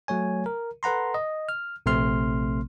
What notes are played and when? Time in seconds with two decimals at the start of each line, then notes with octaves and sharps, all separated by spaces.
0.08 F#3 A3 C#5 G#5
0.46 A#4
0.83 A4 B4 F#5 A#5 C6
1.14 D#5
1.49 F6
1.86 A#1 C3 A3 C4 C6 F6